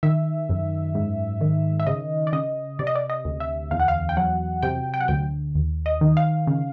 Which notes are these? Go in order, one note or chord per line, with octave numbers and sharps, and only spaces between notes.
D#3 E5
F#2
G#2
D#3
E5
C#3 D#5
D5
C#3 D#5
C3 D5
D#5
D5
D#5
D2
E5
E2 F5
F#5
F5
G5
F#3 F#5
C3 G5
G5
F#5
D2 G5
D#2
D#5
D#3
F5
C#3